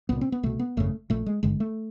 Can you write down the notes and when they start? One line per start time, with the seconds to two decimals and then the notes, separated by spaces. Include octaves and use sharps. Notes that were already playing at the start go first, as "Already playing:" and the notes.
0.09 C2 A#2 B3
0.21 C4
0.32 B3
0.43 C2 B2 A3
0.59 B3
0.77 G#1 F#2 C#3 A3
1.10 A#1 A#2 A3
1.26 G#3
1.43 G#1 G2 D3 G#3
1.60 A3